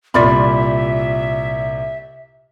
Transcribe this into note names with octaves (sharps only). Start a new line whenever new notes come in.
C2 A#2 F4 D5 E5 B5